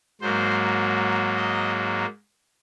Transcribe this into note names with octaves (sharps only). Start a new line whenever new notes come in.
G#2 F#3 A#3 C5
D#5